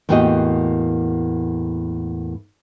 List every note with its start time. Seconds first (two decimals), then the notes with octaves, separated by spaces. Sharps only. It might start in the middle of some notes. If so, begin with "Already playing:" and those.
0.09 E2 A2 A#3 F#4 G4 D#5